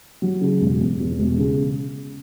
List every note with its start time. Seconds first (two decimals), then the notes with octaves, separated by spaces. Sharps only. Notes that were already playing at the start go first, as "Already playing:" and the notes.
0.22 F#3
0.41 C#3
0.61 E1
0.80 E2
1.00 E2
1.19 E1
1.38 C#3